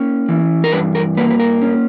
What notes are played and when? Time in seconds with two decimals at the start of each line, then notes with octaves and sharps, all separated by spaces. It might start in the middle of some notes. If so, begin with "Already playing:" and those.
Already playing: A#3 C#4
0.29 E3
0.64 A#4
0.73 G2 B4
0.95 A#4
1.17 A#3 B4
1.30 B4
1.39 A#4
1.62 C#4